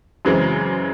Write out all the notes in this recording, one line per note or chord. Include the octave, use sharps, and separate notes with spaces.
F#2 C#3 E3 G#3 C4 G#4